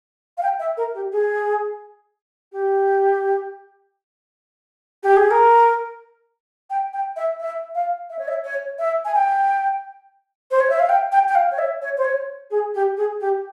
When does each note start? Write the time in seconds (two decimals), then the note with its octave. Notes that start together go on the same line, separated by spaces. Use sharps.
0.38 F5
0.43 G5
0.59 E5
0.77 A#4
0.94 G4
1.12 G#4
2.52 G4
5.03 G4
5.17 G#4
5.31 A#4
6.70 G5
6.93 G5
7.16 E5
7.40 E5
7.75 F5
8.10 E5
8.19 C#5
8.28 E5
8.44 C#5
8.79 E5
9.05 G#5
9.15 G5
10.51 C5
10.60 C#5
10.70 E5
10.79 F5
10.89 G5
11.12 G5
11.29 G5
11.35 F5
11.52 C#5
11.59 E5
11.82 C#5
11.98 C5
12.05 C#5
12.51 G#4
12.75 G4
12.97 G#4
13.21 G4